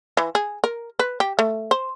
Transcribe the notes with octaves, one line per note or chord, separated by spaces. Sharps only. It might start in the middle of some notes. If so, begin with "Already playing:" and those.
E3
G#4
A#4
B4
G4
A3
C5